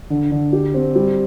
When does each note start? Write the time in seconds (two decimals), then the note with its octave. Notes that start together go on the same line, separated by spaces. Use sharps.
0.10 D3
0.31 D3
0.53 G4
0.74 C4
0.95 G3